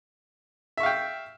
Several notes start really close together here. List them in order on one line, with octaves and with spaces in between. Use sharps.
E5 C#6 F5 G5